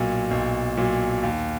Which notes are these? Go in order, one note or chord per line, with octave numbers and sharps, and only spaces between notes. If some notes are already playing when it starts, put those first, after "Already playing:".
Already playing: B1 A#2 F#3
B1
A#2 F#3
D#2